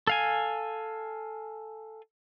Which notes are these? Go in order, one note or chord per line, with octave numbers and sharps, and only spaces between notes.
A4 F5 G#5